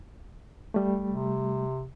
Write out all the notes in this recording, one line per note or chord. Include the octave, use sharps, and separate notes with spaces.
G3 A3
C3